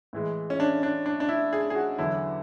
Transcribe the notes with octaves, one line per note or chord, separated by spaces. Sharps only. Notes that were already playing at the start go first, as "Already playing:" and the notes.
A2 E3 G#3
C#4
D4
D4
D4
D4
E4
G#4
G#4
F#4
E2 D3 F#3 E4